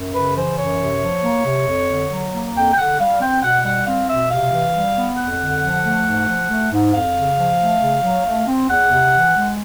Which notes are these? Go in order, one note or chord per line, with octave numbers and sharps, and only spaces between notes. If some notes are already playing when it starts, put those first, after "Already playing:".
Already playing: F#2
C#3 B4
E3 C5
F#2 C#5
C3
F3
A#3
C3
F2
D3
F#3
A#3
F2 G5
G5
D3 F#5
G3 F5
C4 G5
B2 F#5
G3 F#5
C4 F5
B2 E5
C3 F5
E3
G3
B3
F2 F#5
D3
F3
A3
G#2
F3
A3
G#2
F2 F5
C#3
F3
A3
C#3
F#3
A3
C4
E2 F#5
C3
E3
G#3